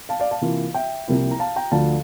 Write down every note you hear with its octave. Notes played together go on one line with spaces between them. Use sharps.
F5 A5
D5 F5
F5 A5
C3 E3 A#3 F4
E5 G5
C2 C3 F3 A#3 E4
A#5
F5 A5
G5 A#5
D2 D3 F3 F5 A5